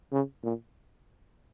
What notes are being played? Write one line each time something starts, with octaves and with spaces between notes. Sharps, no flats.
C#3
A#2